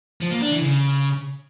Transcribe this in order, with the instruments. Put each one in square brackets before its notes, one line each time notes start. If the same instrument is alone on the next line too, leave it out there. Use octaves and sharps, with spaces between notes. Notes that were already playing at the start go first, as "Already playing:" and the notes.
[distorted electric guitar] F3
A#3
D4
E3
C#3